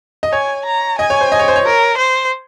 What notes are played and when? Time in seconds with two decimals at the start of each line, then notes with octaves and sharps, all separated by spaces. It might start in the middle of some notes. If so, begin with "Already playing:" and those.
0.23 D#5
0.32 C#5 G#5
0.66 A#5
0.98 D#5 G#5
1.10 C#5
1.21 C5
1.32 D#5
1.40 C#5
1.48 C5
1.56 C#5
1.65 A#4
1.97 C5